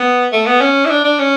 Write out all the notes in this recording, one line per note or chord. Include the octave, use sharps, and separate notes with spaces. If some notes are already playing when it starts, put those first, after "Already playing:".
Already playing: B3
A3
B3
C#4
E4
D4
D4
C#4